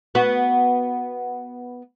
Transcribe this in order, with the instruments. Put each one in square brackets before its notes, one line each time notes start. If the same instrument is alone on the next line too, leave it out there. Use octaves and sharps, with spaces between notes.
[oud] B3 F#4